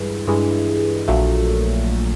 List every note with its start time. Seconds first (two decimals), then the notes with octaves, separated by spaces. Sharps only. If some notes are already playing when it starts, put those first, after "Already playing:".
Already playing: G2 E3 G#3
0.27 G2 E3 G#3
1.08 A#1 A#2 F#3 A3